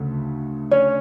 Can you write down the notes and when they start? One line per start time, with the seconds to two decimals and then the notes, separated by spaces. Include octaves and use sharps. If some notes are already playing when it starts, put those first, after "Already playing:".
Already playing: D2 C#3 A3
0.71 C#4 C#5